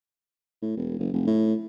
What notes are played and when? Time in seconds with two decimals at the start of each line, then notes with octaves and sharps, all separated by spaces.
0.62 A2
0.77 E1
0.98 F#1
1.13 F1
1.27 A2